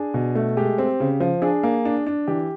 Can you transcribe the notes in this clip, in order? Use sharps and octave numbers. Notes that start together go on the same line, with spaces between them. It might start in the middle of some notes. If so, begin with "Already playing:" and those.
Already playing: D4 G#4
B2
A3
G#3 G4
C4
C#3
F3
D4 G#4
A#3
D4
D4
E3 G4